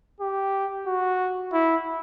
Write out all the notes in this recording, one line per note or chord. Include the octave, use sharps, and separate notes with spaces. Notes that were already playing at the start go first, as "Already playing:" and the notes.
G4
F#4
E4